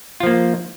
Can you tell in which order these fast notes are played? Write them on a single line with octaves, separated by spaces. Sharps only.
F4 F3 A#3